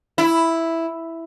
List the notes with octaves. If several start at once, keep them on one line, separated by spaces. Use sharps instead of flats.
E4